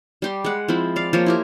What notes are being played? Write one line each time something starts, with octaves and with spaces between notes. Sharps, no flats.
G3 G4 C6
G#3 F#5
F3 C4 E4 B5
D5 F5
F3 A#3 C#5
E4 G4 A#4